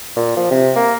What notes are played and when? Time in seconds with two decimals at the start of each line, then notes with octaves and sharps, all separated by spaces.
0.16 A#2
0.37 F3
0.51 C3
0.75 A#3